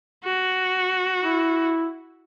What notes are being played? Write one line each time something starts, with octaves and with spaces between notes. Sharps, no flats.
F#4
E4